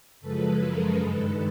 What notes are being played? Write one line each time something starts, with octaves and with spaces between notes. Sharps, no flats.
F#2 C#3 F3 G#3 A4 B4
G#4 A#4
G2 D#3 G#3 A4 B4